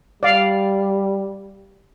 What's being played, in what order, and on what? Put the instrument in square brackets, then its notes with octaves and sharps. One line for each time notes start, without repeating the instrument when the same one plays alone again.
[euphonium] G3 [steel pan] D5 F5